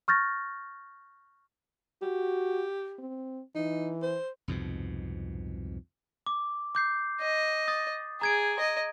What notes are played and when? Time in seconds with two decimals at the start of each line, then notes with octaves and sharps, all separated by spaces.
0.08 C#6 F6 G6 A6 A#6
2.02 F#4 G4
2.99 C4
3.55 E3 D#4
4.02 C5
4.48 C2 F2 G#2 B2
6.27 D6
6.75 D6 G6 C7
7.21 D#5
7.68 D#6 A6
8.21 G#4 A#5 G#6 D7
8.59 D#5